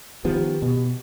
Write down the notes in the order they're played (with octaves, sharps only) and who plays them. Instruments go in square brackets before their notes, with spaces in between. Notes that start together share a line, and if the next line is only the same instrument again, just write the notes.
[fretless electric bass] D#3 F3 B3 [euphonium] G4
[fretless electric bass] B2